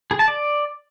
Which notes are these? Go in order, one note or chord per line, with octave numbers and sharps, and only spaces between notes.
G#4
A5
D5